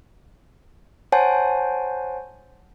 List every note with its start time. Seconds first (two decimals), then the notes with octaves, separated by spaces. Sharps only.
1.12 C5 C#5 F#5 G#5 A5